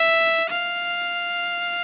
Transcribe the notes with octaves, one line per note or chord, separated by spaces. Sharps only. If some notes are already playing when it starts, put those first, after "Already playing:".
Already playing: E5
F5